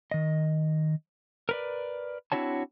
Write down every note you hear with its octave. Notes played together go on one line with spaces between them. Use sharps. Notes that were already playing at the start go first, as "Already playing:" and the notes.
D#3 D#5
A#4 B4 D5
C4 D4 E4 F#4 C#5 A5